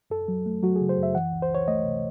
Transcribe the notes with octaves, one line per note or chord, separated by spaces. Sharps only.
F#2 A4
F#3
A3
F#3 F#4
G#4
C#3
C5
F#2
E5
E3 F#5
C#2
C5
C#2 C#5
A3 D#5
C3